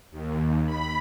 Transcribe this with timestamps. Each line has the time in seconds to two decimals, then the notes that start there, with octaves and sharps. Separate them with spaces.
0.11 D#2
0.66 B5